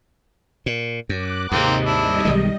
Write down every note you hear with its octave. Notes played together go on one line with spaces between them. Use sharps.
A#2
F#2 D6 F#6
D#2 G#2 C3 A#3 C4 D#4
G3 D4 E4 D#5
B1 D#3 G#3